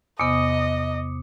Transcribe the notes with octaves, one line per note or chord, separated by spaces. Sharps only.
E2 C3 B3 D#5 D6 D#6 C#7